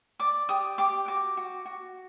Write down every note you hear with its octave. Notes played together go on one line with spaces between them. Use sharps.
D5 D6
G4 D#6
G4 D6
F#4 D6
F#4
F#4